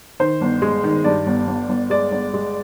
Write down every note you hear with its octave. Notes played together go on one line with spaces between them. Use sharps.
D#3 C5
G1
G#3
D#3
G2 D5
G1
G1
G1
G#3 D5
G1
G#3